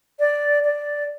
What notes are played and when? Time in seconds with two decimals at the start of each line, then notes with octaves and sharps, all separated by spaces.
0.19 D5
0.64 D5